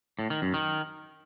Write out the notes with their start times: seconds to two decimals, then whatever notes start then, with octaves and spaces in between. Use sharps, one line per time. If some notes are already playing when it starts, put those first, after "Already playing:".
0.19 A2
0.30 D#3
0.42 F#2
0.54 D#3